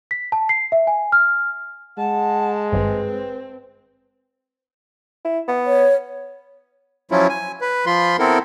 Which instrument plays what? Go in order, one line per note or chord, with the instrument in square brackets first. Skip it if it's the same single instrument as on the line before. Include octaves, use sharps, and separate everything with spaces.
[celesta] B6
A5
C7
E5
G#5
F6
[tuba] G#3 [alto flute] F#5 [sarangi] A5
[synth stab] G#1 G2 [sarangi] C4 [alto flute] B4
[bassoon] E4
B3
[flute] C#5
[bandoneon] F3 F#3 C#4 E4 F4
G#5
B4
F3 F4 B5 C6
B3 C4 E4 A4 A#4